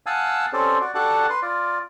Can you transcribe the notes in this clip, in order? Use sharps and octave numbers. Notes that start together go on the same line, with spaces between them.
F5 F#5 G#5 A5 D#6 E6
C4 C#4 G4 A4 C5 D5
F#4 D5
D4 F#4 G4 A4 F#5 A5
B4 C6
F4 D5